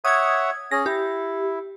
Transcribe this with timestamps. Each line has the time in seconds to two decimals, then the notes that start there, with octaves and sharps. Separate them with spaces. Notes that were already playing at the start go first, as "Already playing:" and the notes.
0.05 C#5 E5 F#5 D#6 G#6
0.71 C#4 G#4 A#6
0.86 E4 G4